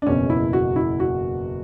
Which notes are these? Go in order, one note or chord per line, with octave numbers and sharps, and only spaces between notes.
D4
F#1 E2 B2 C#4
E4
F#4
E4
F#4